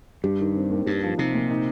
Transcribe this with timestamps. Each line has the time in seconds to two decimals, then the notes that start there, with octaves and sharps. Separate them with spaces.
0.24 G2 G4
0.40 D#3
0.56 C4
0.71 D#2
0.86 G2 G4
1.03 F3
1.18 C3 D#4
1.34 A#2
1.51 D#4